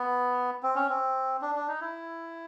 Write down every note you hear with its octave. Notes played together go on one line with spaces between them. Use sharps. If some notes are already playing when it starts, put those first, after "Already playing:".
Already playing: B3
C4
C#4
C4
D4
D4
D#4
E4